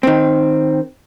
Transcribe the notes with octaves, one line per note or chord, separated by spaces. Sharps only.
D#3 C4